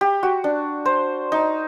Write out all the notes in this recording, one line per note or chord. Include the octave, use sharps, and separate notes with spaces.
G4
F#4
D4
C5
D#4